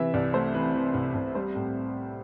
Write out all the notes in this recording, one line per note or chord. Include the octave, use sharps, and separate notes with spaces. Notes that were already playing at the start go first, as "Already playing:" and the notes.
Already playing: C3 E3 E5
C2 D5
A3 C5
E3 B4
E3
C2
C2
G3 C5
A2